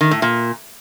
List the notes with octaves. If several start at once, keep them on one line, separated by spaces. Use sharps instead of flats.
D#3
A2
A#2